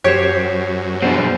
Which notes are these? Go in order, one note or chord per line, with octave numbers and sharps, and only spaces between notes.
F#2 G4 C5 C#5
B2 D4 C5